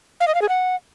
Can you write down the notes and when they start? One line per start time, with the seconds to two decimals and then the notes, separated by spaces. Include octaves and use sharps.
0.21 F5
0.28 D#5
0.35 F5
0.42 G#4
0.49 F#5